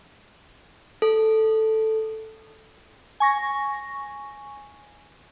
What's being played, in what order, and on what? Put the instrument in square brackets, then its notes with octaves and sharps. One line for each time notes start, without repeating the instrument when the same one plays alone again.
[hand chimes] A4
[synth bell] G#5 C#6 A#6